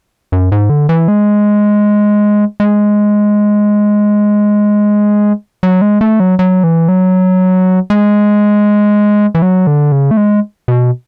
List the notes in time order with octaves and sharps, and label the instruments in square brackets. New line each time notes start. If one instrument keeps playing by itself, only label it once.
[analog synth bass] F#2
G#2
D3
E3
G#3
G#3
F#3
G#3
A3
F#3
F#3
E3
F#3
G#3
E3
F#3
D3
C#3
A3
G#3
B2